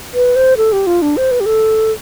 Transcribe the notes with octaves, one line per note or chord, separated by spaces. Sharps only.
B4
C5
A4
G4
F4
D4
C5
B4
G4
A4